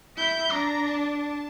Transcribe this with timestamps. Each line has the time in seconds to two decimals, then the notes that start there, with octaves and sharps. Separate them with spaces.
0.17 E4 G6
0.52 D4 A#5
0.88 A5